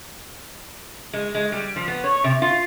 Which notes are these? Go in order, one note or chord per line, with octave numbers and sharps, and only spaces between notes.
G#3
G#3
G3
F3
B3
C#5
C3
F4